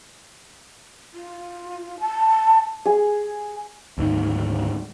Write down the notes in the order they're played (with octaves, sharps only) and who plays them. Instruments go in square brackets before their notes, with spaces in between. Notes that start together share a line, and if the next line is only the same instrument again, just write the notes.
[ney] F4
A5
[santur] G#4
[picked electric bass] D2 G#2 D#3